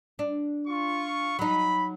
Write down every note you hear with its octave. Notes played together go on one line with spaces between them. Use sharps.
D4
F4 C#6
F#3 D#4 B5